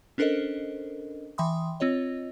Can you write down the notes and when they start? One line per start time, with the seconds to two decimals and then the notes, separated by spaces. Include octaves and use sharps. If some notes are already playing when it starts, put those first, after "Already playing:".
0.18 C#4 D4 A4 A#4 C5 D#5
1.38 E3 E5 G5 B5 C6 D#6
1.80 C4 F4 C#5 D#5